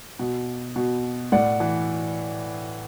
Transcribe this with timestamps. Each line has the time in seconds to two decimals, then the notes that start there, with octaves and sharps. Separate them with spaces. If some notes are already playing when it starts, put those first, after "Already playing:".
0.19 B2
0.76 B2
1.32 A2 D5 F#5
1.60 E3